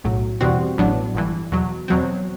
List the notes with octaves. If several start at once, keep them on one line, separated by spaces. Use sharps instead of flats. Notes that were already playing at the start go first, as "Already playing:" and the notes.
B1 A2 F#3
E2 B2 G3 C4 F#4
A1 A2 F#3 B3 D4
G1 G2 E3
E2 B2 F#3
E2 B2 F#3 C4